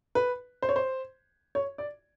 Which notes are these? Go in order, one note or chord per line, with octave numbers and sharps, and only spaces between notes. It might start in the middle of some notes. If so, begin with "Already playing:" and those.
B4
C5
C#5
C5
C#5
D5